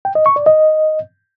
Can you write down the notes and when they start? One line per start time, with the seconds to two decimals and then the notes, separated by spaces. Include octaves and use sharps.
0.05 G5
0.15 D#5
0.26 C#6
0.36 D5
0.46 D#5